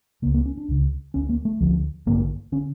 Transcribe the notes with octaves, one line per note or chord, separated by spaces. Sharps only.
C#2 C#3 A#3
A#3
C#4
D4
C#2 C#3
D2 D3 C#4
A#3
A3
D2 D3 F3
A1 G2 D3 A#3
D3 C#4